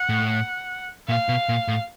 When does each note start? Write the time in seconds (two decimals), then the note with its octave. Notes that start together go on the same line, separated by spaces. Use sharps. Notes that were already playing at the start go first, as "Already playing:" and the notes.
Already playing: F#5
0.09 A2
1.08 A#2 F5
1.29 B2
1.49 A#2
1.68 A2